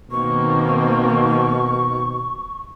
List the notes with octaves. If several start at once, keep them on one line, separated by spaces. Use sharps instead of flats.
B2 D#3 A#3 C4 C#6